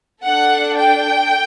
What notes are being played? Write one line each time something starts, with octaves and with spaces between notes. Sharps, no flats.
D4 A4 F#5
G5